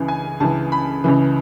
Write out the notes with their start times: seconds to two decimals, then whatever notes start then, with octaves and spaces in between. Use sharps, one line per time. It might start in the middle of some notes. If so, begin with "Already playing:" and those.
Already playing: C#2 C#3 E3
0.08 G#5
0.40 C#2 C#3 E3 A5
0.72 B5
1.04 C#2 C#3 E3